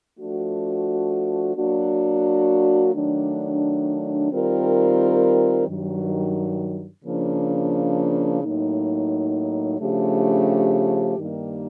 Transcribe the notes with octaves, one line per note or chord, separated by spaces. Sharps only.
F3 A3 D4 F#4
F#3 A#3 D4 F#4
D#3 F#3 A3 D4
D#3 G3 C4 F4 A#4
G2 D#3 F#3
C#3 F3 A#3 D4
A2 F#3 A#3 D#4
C#3 F3 A3 D4 G4
G2 D#3 G3 A#3 D#4